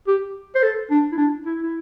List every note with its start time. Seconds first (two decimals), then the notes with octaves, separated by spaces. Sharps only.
0.07 G4
0.55 C5
0.63 A4
0.91 D4
1.12 E4
1.18 D4
1.46 E4
1.63 E4